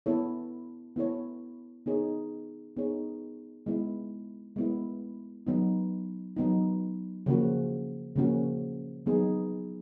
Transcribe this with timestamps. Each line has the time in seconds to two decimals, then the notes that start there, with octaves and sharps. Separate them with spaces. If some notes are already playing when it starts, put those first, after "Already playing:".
0.06 B3 E4 A4 C#5
0.96 B3 E4 A4 C#5
1.86 B3 D#4 G#4 C#5
2.77 B3 D#4 G#4 C#5
3.66 G#3 B3 E4
4.56 G#3 B3 E4
5.47 F#3 B3 D#4
6.37 F#3 B3 D#4
7.26 C#3 F3 A#3 C#4 F#4
8.16 C#3 F3 A#3 C#4 F#4
9.06 F#3 B3 D#4 G#4